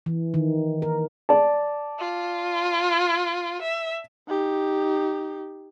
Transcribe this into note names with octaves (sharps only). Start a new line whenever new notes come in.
E3
D#3
A#4
D5 A5
F4
E5
D#4 G4